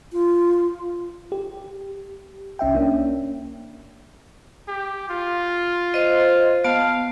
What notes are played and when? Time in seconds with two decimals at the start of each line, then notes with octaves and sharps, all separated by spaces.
0.12 F4
1.32 G4
2.59 C2 C#4 E5 G5
2.74 A#3 C#4 D4
4.68 G4
5.09 F4
5.94 C5 D#5
6.64 B3 F5 A5